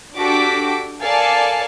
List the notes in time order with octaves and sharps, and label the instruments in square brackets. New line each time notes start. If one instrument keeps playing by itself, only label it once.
[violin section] D4 F#4 G4 A4 D6 B6
A4 A#4 D5 F5 G#5 A5